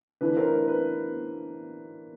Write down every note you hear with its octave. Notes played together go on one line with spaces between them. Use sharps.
E3 A3 D4 B4
A#4 C5
B4